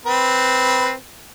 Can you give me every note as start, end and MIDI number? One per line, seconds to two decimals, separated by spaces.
0.06 0.93 60
0.06 0.93 71